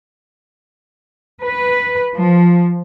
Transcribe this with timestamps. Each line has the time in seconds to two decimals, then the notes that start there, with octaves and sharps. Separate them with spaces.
1.43 B4
2.16 F3